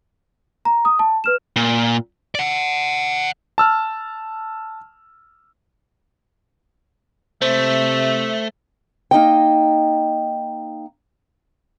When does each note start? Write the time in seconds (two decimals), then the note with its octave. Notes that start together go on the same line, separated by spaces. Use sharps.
0.65 A#5
0.85 D#6
0.99 A5
1.24 B4 F6 E7
1.56 A#2
2.35 D5 F#5
3.58 A5 E6 F6
7.42 C3 A3 C5 E5
9.11 A#3 D#4 D#5 G5